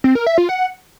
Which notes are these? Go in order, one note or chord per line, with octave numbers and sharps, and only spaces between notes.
C4
A#4
E5
F4
F#5